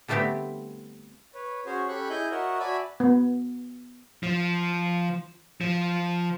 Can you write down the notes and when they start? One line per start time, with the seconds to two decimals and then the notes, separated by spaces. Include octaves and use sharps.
0.08 D3 G3 A3 B3 C4 G4
1.34 B4 C#5
1.66 C#4 F#4 G#4 C5 C#5
1.88 C#4 G4 A4 B5 C#6 F#6
2.09 E4 G#4 D#5 G#5 G6
2.31 F#4 A#4 C#5 D#5 E5 F#5
2.59 F#4 D5 E5 G#5 A5 B5
3.00 B3
4.23 F3
5.61 F3